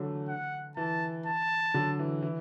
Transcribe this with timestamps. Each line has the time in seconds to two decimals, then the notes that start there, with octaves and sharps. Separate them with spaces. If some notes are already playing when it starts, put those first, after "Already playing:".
Already playing: D3 E3 F#3 A3
0.29 F#5
0.77 E3 A5
1.26 A5
1.74 D3 F#3
1.99 E3
2.23 E3